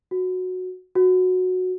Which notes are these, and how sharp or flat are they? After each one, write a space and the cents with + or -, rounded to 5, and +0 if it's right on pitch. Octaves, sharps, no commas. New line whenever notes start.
F#4 -10
F#4 -10